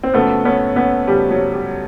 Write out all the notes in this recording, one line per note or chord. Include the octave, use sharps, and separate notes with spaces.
C4
F#2 C#3 F3 A3 B3
B3 C#4
B3 C#4
F#2 C#3 F3 G3
F#3
G3